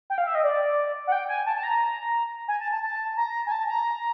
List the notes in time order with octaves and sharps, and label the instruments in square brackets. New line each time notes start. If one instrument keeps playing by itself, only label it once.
[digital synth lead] G5
F5
E5
D#5
D5
F#5
G5
G#5
A5
A5
A#5
G#5
A5
A5
A5
A#5
G#5
A5
A#5